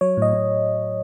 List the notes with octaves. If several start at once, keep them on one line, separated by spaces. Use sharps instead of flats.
F#3 C#5
A2 D#5
A2